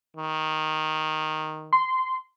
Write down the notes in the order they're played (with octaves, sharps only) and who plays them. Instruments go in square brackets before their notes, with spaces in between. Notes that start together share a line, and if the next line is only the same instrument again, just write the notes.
[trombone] D#3
[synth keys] C6